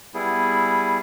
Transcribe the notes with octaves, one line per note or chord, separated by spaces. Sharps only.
G3 B3 E4 G#4